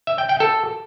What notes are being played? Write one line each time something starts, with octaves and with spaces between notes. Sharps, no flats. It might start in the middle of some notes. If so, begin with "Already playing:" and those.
E5
G5
G5
A4